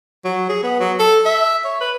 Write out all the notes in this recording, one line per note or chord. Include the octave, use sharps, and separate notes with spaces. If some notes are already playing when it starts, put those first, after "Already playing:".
F#3
G#4
B3
F#3
A4
E5
C#5
B4